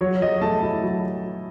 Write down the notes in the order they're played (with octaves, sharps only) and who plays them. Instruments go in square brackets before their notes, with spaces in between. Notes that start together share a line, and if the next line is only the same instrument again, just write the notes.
[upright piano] F#3 C#5
F#3 D#5
A3 A5
E4
F#3